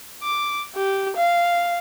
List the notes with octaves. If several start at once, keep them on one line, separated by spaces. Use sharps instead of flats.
D6
G4
F5